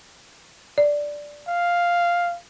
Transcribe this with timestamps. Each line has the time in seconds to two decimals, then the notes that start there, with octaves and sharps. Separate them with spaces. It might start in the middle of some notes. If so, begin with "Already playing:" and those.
0.78 D5
1.48 F5